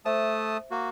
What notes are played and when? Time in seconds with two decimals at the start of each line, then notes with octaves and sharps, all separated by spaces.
0.06 A3 C5 E5 A5 D#6
0.71 A#3 F#4